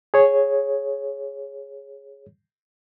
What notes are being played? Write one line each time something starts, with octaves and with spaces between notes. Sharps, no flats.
G#4 C#5